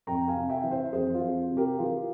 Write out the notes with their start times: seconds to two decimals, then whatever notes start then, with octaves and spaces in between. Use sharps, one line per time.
0.07 F2 G5 A#5
0.28 F5 G#5
0.36 C3
0.49 E5 G5
0.63 E3
0.71 C5 E5
0.93 F2 G#4 C5
1.15 F4
1.21 F2
1.50 C3
1.57 G4 A#4
1.78 E3 F4 G#4